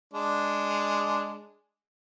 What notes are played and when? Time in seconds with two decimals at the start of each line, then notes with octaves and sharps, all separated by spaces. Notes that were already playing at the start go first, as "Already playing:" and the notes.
0.14 G#3 D4